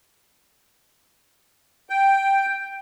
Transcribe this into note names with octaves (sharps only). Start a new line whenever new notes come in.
G5